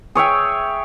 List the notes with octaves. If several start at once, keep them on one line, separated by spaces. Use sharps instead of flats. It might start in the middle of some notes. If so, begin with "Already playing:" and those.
G#4 C#5 E5 G5